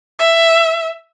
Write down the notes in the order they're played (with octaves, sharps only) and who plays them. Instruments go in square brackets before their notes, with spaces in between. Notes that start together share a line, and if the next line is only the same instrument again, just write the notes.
[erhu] E5